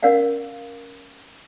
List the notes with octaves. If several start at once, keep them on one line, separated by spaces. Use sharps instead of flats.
C#4 A#4 D5 F5 F#5